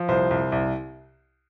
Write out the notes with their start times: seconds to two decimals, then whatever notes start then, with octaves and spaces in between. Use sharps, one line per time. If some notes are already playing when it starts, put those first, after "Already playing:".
Already playing: F3
0.08 C2 C5
0.31 C2
0.52 C2